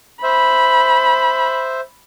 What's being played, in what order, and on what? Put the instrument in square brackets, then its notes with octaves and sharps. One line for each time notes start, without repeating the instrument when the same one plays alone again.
[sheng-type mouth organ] C5 E5 [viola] B5